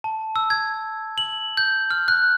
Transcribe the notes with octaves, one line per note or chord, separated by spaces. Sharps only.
A5
E6
G#6
F#7
G6
F6
F#6